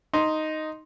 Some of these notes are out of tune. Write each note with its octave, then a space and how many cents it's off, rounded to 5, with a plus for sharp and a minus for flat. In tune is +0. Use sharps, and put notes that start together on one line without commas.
D#4 +0 C6 +0